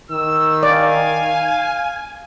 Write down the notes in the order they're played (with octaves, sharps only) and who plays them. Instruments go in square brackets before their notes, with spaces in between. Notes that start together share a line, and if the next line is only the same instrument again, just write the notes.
[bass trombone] D#3 [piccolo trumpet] E6
[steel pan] D5 [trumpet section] F5 [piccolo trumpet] G#5